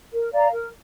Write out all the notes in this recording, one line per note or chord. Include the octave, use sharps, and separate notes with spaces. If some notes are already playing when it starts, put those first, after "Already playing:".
A#4
D5 F5 A#5
A#4